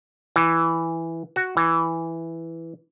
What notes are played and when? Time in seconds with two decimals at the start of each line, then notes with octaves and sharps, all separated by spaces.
0.36 E3
1.36 F#4
1.57 E3